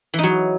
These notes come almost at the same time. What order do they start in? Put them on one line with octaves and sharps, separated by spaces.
E3 D#4 F#3